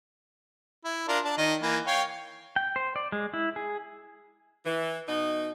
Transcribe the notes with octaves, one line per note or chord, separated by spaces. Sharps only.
E4
D4 F4 A#4
D4 A5
D#3 D#5
E3 A#3
C#5 F5 G5
G5
C5
D5
G#3
E4
G#4
E3
B2 D#4